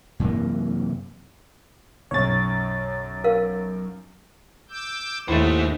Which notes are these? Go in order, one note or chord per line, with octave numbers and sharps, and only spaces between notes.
F#2 C3 E3 A#3
B1 F#2 C#5 A6
A#4 F5
D6 E6 G6
D#2 A2 A3 D#4 C5 E5